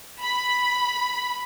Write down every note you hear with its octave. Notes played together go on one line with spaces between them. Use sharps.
B5